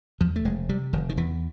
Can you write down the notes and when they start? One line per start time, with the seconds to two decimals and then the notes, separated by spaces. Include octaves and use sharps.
0.21 E2 F3
0.36 A3
0.45 F1 G#3
0.69 C3 G3
0.93 F1 D#3
1.09 D#3
1.17 E2 E3